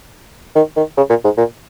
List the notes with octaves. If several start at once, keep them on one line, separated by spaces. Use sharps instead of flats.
D#3
D#3
C#3
A#2
G#2
A#2